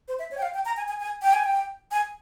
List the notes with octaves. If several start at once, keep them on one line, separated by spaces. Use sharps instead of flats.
C5
E5
C#5
G5
F5
G5
A#5
G#5
G#5
G#5
G5
G#5
G5
G#5